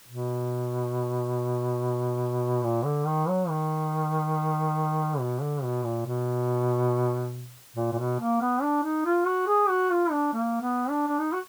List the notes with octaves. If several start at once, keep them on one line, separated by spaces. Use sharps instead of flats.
B2
A#2
D3
D#3
F#3
D#3
B2
D3
B2
A#2
B2
A#2
A#2
B2
A#3
B3
D4
D#4
F4
F#4
G#4
F#4
F4
D4
A#3
B3
D4
D4
D#4
F#4